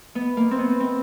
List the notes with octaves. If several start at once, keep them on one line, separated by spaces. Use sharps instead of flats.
B3
A#3
C4
B3
C4